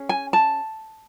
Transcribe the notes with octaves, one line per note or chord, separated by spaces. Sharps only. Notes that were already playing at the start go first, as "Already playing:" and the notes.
Already playing: C#4 G#4
G#5
A5